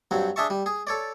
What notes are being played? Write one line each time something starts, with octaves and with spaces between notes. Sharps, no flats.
G2 F#3 C4
D4 G#4 E5 A5 C#6
G3
G#4
A4 C#5 D5